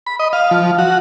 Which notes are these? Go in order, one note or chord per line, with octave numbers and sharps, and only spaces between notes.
B5
D#5
F5
F3
F#4